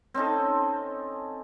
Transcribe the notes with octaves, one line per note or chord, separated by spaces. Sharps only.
C4 C#4 D#4 A4